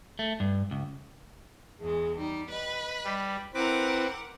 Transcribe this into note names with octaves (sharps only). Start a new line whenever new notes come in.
A3
G2
C#2
E2 G#3 G#4
G3 D#4
B4 D#5 B5
G3
C4 E4 A#4 B4 F#5 D6